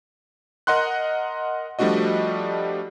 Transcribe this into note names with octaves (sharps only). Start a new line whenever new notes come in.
A#4 D#5 F#5 C6 F#6
F3 G3 A3 D4 F#4 D#5